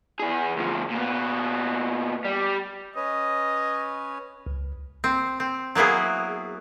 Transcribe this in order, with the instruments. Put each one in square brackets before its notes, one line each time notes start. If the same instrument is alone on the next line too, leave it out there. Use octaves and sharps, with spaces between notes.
[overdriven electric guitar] E2 G#4
D2 F3
A#2 B3
G3
[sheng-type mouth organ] C#4 B4 C#5 [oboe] D#5
[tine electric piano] C#2
[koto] C4
C4
F#3 A#3 B3 E4 G#4